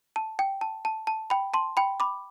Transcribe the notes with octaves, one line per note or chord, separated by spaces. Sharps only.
A5
G5
A5
A5
A5
G5 B5
A5 C6
G5 B5
B5 D6